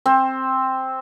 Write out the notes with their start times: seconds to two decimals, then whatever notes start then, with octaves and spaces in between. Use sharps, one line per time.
0.06 C4